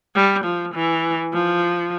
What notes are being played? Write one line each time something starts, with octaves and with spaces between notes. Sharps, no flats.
G3
F3
E3
F3